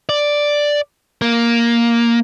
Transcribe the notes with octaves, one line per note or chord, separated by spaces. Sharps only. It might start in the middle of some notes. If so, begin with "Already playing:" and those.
D5
A#3